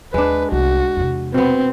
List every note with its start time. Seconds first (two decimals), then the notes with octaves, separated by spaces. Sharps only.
0.14 D#2 G#3 D4 B4
0.52 C2 A3 F#4
0.97 E2 C3
1.34 B2 B3 C4